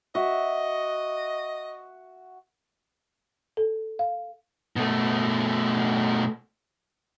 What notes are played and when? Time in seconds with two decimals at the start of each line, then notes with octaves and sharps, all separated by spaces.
0.15 F#4 D#5 E5
3.57 A4
3.99 F5
4.76 B2 A3